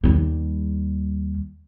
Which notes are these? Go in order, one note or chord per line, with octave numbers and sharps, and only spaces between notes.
D#2 G3